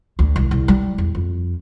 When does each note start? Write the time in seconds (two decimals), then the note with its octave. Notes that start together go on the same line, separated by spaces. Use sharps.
0.19 D2
0.36 C2
0.51 C2
0.68 G3
0.98 E2
1.15 F2